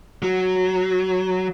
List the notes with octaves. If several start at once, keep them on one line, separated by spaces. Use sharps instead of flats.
F#3